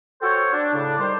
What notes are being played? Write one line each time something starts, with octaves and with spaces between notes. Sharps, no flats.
F#4 A4 C5 C#5 G5
D4
A2 C#3 D4
D#3 G3 G4 C5